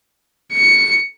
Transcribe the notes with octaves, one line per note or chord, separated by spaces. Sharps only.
C#7